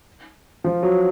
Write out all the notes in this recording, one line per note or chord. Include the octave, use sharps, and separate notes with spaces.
F3
F#3